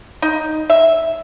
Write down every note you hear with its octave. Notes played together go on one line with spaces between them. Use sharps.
D#4
E5